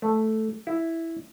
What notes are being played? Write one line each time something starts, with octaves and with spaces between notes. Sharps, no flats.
A3
E4